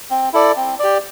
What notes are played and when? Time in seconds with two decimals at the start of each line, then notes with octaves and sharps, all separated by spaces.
0.11 C4
0.33 E4 A4 D5
0.56 C4
0.79 G4 D5